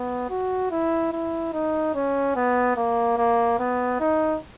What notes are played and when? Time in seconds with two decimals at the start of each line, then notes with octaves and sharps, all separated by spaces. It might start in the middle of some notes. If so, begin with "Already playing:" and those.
Already playing: B3
0.30 F#4
0.71 E4
1.12 E4
1.53 D#4
1.95 C#4
2.36 B3
2.76 A#3
3.17 A#3
3.59 B3
4.00 D#4